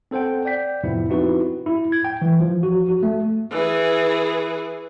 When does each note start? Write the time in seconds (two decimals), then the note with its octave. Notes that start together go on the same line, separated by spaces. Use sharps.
0.11 C4 A4 C5 F#5 G5
0.45 D5 G5 G6 B6
0.84 F2 A2 C3 F3 B3 E4
1.10 C4 D#4 E4 F#4 G4 B4
1.66 E4
1.92 G#6
2.05 G5
2.22 E3
2.40 F3
2.63 F#4
2.89 F#4
3.03 A3
3.51 E3 G#4